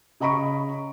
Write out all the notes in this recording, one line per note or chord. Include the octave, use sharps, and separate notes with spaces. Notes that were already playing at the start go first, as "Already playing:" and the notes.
C#3 D#5 A#5 B5 C#6 D7